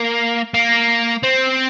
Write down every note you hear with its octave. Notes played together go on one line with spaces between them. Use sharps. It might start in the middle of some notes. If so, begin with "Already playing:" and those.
Already playing: A#3
A#3
C4